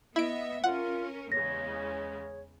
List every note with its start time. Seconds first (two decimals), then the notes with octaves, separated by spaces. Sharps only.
0.16 B3 E4 D#5 E5 D7
0.64 C#4 F4 A#4 F#5
1.32 E2 C#3 G#3 C#5 A#6